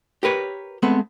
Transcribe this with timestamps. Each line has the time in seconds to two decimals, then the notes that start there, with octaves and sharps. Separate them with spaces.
0.23 G4 A#4 B4 C#5
0.83 G#3 A3 B3 C4